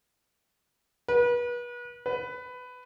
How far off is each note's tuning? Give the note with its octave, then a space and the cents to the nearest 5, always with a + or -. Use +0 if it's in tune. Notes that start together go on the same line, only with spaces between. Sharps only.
B4 -35
B4 +15